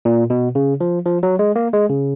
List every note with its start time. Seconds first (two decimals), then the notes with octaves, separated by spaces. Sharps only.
0.05 A#2
0.30 B2
0.55 C#3
0.81 F3
1.06 F3
1.23 F#3
1.39 G#3
1.56 A#3
1.73 G#3
1.89 C#3